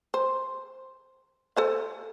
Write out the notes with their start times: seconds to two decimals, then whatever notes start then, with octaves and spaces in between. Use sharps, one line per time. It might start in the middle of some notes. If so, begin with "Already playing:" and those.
0.14 C5
1.56 A4 C5 F5